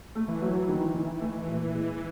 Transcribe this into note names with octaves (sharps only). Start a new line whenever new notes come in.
A3
E3
F#3
D#3
D#3
A3
A#2
G#3